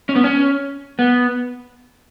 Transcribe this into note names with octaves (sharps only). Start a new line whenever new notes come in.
C#4
B3
C#4
B3